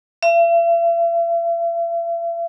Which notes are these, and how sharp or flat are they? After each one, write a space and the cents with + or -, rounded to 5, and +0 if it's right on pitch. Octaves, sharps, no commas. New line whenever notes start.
E5 +45